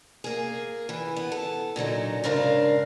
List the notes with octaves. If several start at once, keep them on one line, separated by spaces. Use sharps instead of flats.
A#3 G#4
E3
B3
A4
A#2 D3 F#3 D#4
G#2 C#3 D4 A#4 F5